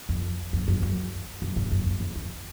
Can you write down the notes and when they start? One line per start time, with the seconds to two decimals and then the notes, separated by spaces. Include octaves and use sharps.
0.09 F2
0.53 F2
0.68 F#2
0.82 F#2
1.42 F#2
1.56 G#2
1.72 F#2
1.86 F2
2.01 F2
2.16 E2